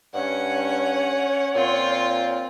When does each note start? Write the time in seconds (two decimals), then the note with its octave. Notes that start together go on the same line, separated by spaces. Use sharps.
0.14 G2 C#4 C#5 F#5
1.55 A#2 C4 F4